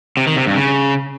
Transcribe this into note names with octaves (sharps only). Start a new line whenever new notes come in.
C3
D#3
C3
G2
C#3